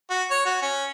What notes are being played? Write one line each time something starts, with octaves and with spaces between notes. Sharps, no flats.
F#4
C#5
F#4
C#4